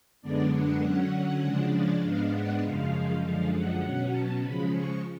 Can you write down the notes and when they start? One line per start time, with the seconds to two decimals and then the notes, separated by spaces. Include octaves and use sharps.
0.22 F#2 D3 G#3 B3 D4 D5
0.52 F#5
0.82 D3 F#3 C#4 F#5
1.41 C#3 F3 G#3 D4
1.71 D5
2.01 G#2 G#3 B3 D4 F5
2.31 F#5
2.61 F#2 C#3 F3 G#3 F5
3.21 F#2 D3 F3 G#3 F5
3.51 F#5
3.81 B2 F#3 C#4
4.11 A5
4.41 C#3 F3 G#3 B5
4.71 C#6